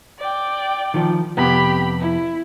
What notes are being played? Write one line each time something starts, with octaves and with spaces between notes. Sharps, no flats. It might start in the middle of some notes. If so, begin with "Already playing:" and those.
D5 G5
D#3 F3
F2 C3 B3 G4 B5
E4